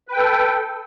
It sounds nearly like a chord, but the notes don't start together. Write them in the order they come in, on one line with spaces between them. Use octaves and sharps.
B4 G5 A4